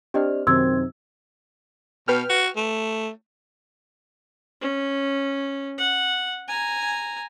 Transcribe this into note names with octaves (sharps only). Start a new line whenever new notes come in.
C4 D4 G4 D5 D#5 F6
F#2 C3 D#3 C4 C6 E6 G#6
B2 B4 G5 F6
F#4
A3
C#4
F#5
G#5 A#5